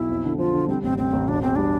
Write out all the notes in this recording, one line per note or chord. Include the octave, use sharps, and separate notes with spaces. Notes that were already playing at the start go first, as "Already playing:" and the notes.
Already playing: B1 E4
F2
D3
F3 F4
D3
G3 C4
A1 C4
A1 C4
A1
E1 D4
E2 C4
G3 D4